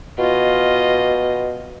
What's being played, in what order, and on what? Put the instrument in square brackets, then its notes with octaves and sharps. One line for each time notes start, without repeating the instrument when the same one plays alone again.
[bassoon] B2 [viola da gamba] F4 D#5